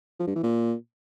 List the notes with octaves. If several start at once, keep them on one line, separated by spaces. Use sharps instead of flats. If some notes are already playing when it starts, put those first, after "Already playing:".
F3
G2
E3
A#2